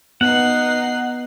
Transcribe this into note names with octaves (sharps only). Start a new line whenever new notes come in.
B3 D#4 F#5 C7